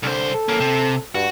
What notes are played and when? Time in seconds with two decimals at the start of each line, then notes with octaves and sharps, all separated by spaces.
0.03 C2 D3 C5
0.34 A4
0.49 A#3 C#4
0.60 C3
1.15 G2 F#4